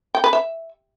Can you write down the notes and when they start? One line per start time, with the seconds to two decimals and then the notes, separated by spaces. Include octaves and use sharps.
0.15 G5
0.24 B4
0.33 E5